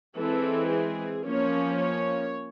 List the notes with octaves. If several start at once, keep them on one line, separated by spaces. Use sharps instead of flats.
E3 G#3 C4 A4
G#4
F3 A#3 C#4 C#5
C#5